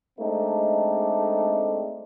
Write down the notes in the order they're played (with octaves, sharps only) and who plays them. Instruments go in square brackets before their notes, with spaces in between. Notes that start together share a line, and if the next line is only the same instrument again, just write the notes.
[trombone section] G#3 A3 C4 D4 D#4